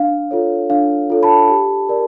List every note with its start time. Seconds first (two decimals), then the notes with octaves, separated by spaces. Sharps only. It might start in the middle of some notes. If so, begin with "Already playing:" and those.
Already playing: D4 F5
0.31 F4 A4 C#5
0.70 D4 F5
1.10 F4 A4 C#5
1.23 A5 B5
1.50 G4
1.89 A#4 D5